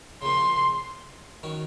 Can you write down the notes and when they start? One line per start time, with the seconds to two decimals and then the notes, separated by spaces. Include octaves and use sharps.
0.22 C#3 F3 A#3 C6
1.43 D#3 F#3 C#4